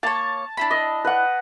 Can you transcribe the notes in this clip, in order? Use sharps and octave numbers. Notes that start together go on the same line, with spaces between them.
A#3 C#5 A5
D4 E4 B5
D#5
B4 F#5